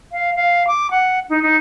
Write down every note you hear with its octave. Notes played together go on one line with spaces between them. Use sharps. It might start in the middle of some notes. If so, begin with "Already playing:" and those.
F5
F5
D6
F#5
D#4
D#4